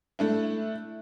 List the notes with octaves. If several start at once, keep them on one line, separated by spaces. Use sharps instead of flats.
A3 D4 E4